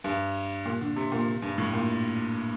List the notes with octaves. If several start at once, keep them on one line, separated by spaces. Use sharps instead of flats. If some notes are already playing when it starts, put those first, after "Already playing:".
G2
A#2
D3
C3
A#2
G2
A2
A#2